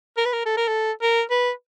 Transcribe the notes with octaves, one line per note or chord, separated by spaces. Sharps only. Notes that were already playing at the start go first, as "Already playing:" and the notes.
A#4
B4
A#4
A4
A#4
A4
A#4
B4